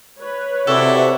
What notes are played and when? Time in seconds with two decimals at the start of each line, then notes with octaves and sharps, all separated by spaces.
0.20 B4 C#5
0.67 C3 E4 F#4 A4 D5